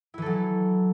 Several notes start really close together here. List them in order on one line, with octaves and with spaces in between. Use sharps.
E4 E3 A4 F#3